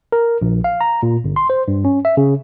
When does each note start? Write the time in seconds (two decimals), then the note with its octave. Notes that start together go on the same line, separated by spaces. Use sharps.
0.12 A#4
0.42 A#1
0.64 F5
0.81 A#5
1.03 A#2
1.24 G1
1.36 C6
1.50 C5
1.68 G2
1.85 C#4
2.05 E5
2.17 C#3